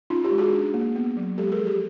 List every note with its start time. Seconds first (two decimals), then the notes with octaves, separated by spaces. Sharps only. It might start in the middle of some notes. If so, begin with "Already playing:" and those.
0.10 C#4 D#4 F4
0.24 F4 G4
0.31 G#3
0.38 F#4 G#4
0.52 D4
0.74 A#3
0.95 B3
1.17 F#3
1.38 G#3 G4 A4
1.52 G#4 A#4
1.59 F3
1.66 G4 A4